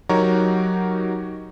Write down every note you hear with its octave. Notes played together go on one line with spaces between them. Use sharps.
F#3 D#4 F#4 G4 A#4 C#5